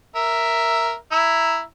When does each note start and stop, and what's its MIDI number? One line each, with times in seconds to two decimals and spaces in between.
0.15 0.94 70
0.15 0.94 76
1.12 1.61 64
1.12 1.61 82
1.12 1.61 88